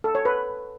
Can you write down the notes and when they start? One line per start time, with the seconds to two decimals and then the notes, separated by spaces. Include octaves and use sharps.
0.04 A4
0.15 C#5
0.25 B4